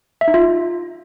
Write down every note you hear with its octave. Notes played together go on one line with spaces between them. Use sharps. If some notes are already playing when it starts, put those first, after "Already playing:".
E5
D#4
F4